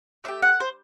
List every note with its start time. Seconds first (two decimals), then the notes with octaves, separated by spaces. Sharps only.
0.24 A3 D4 G4 E5
0.42 F#5
0.60 C5